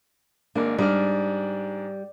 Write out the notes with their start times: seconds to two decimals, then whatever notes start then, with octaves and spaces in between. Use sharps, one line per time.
0.55 G#1 A#3 D4
0.78 G#2 G3 D4 F6